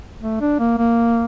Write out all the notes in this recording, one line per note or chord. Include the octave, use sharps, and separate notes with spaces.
A3
D4
A#3
A#3